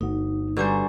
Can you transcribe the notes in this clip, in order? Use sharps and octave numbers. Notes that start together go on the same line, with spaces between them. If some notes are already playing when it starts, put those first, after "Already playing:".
G1 A3 D#4 F#4
D3 G3 F#4 B4 C5 G#5 A#5 C#6